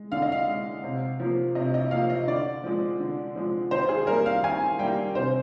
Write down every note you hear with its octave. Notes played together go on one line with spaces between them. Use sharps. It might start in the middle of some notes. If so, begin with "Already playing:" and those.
Already playing: G#3
D3 F5
D#5
F5
G#3
C3
F3 A#3
C3 D#5
D#5
F3 A#3 F5
D#5
D3 D5
F3 G#3
D3
F3 G#3
D#3 C5
G#4
G3 A#3 A#4
F5
D#3 G#5
G3 A#3 G5
C3 C5